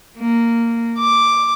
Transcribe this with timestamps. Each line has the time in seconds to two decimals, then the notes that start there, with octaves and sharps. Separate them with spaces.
0.18 A#3
0.99 D6